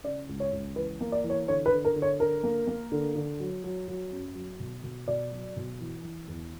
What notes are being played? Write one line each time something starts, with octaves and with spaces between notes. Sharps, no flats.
C#3 D5
C#2
C#5
C#2
E3 B4
A#3
D5
E3
C#5
D3 C#5
B4
D3
A#4
D3
C#5
D3 A#4
A#3
A#3
D3
D3
F#3
F#3
F#3
F#2
F#3
B2
B2
B2 D5
F#3
B2
E3
E3
E2